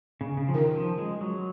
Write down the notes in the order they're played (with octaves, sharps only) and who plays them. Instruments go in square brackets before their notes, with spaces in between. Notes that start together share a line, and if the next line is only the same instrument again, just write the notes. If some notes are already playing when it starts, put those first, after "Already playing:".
[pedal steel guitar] C#3
C#3
F3
[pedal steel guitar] D#3 [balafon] C#4 F4 A#4
[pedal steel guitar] F3
G#3
F#3